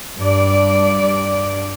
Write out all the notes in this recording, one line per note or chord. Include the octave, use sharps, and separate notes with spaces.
G2 D5